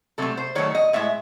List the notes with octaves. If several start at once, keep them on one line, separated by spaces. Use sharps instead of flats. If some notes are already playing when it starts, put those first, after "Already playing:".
C3 F#3 A3 A4
C5
D#3 F#3 A3 C#5
D#5
A2 G#3 E5